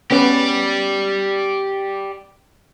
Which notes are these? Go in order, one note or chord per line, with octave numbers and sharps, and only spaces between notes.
B3 C#4 G4 B4 D5